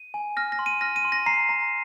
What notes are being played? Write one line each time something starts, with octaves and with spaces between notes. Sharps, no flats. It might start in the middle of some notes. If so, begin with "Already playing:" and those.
Already playing: D#7
G#5
F6 A#6
A#6
C6
D#7
F6 A#6
D#7
C6
A#6
A#5 C7
A#5